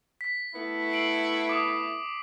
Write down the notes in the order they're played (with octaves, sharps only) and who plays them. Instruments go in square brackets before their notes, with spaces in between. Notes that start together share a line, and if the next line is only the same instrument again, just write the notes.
[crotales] B6
[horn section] A3 B3 E4
[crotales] C7 D7 F#7
D6 D#6